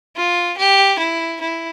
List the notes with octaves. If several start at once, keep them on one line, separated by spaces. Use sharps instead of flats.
F4
G4
E4
E4